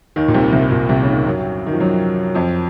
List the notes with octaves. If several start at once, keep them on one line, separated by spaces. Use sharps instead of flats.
D#2 D#3
A#2
C2 C3
C2 C3
A#2
C2 C3
C#3
D#2 D#3
F#2 F#3
D#3
F3
F#2 F#3
F2 F3